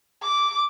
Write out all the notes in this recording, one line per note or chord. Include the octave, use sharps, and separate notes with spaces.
D6